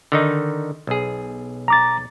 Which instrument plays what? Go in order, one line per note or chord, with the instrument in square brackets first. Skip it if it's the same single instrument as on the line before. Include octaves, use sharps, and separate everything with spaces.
[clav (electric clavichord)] D3 D#3 D#4
B1 G#4
[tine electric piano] A#5 D6 A6